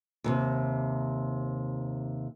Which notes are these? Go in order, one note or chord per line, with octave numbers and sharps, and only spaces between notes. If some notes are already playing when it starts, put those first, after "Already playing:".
D#2 A2 C3